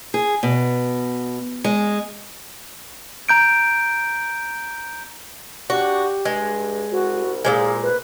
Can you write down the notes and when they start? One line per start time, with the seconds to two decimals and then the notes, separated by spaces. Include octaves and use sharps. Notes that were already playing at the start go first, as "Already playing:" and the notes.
0.14 G#4
0.43 B2
1.64 G#3
3.29 A#5 G6 D7
5.70 D4 F#4 G4
6.25 G2 G#3
6.92 C2 F#4
7.45 A#2 F3 G#3 G#4
7.83 B4